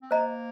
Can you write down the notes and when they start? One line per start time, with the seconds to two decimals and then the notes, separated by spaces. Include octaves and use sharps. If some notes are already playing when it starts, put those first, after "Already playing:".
0.02 C4
0.11 A#3 C5 D#5 A#5